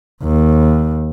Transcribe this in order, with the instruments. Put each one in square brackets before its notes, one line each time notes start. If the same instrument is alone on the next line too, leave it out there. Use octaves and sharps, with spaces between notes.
[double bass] D#2